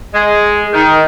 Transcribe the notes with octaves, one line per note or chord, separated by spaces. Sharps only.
G#3
D#3